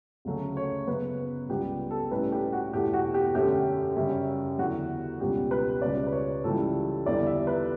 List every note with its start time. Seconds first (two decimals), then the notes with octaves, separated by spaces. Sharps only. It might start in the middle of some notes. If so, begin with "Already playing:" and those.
0.25 D2 C#3 F#3 A3 C#4
0.57 C#5
0.87 F#2 C#3 F#3 B3 B4
1.49 C#2 C#3 G3 B3 G4
1.91 A4
2.11 A2 G3 C#4 B4
2.32 G4
2.53 F#4
2.73 E2 B2 A3 G4
2.94 F#4
3.14 G4
3.34 F#2 D3 A3 C#4 G4
3.96 F#2 C#3 G3 C#4
4.58 E2 D3 F#3 F#4
5.20 C#2 B2 G3 C#4 G4
5.51 B4
5.82 C#2 C#3 G3 C#4 D5
6.06 B4
6.12 C#5
6.44 C#2 C#3 E3 G3 A4
7.06 E2 D3 G3 D5
7.26 E5
7.47 B4